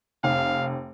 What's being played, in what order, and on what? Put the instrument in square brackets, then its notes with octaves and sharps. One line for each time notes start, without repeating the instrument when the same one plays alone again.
[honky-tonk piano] F1 [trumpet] F5